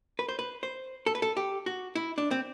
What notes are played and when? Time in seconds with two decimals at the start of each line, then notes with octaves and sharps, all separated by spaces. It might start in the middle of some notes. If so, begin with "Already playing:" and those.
0.19 B4
0.29 C5
0.39 B4
0.63 C5
1.06 A4
1.15 B4
1.22 A4
1.37 G4
1.66 F#4
1.95 E4
2.18 D4
2.31 C4